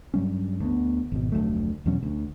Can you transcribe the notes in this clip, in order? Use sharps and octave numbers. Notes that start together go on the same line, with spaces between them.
G2 F#3 G3 C#4
D2 G#3 B3
G#1 B2
F1 D2 F#3 A3
E2 B2 F#3 C#4
D2